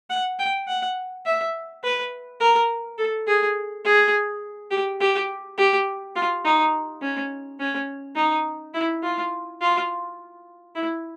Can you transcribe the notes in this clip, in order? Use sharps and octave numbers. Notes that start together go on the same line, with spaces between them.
F#5
G5
F#5
E5
B4
A#4
A4
G#4
G#4
G4
G4
G4
F4
D#4
C#4
C#4
D#4
E4
F4
F4
E4